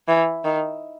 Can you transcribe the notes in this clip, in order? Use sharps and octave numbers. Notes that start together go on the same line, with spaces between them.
E3
D#3